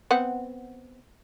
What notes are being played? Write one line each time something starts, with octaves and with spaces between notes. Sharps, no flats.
B3 C4 F#5